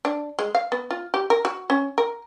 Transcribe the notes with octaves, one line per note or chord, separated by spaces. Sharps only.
D4
G#3
F5
B3
F4
G4
A#4
F#4
C#4
A#4